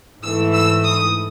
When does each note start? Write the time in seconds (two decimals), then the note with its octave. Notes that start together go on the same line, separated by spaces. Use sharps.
0.21 G#2 E3 A3 E6
0.53 E6
0.84 D#6